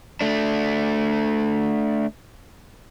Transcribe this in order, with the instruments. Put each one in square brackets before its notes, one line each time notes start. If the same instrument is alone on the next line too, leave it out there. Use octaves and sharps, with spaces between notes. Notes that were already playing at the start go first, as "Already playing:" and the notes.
[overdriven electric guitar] A3 D4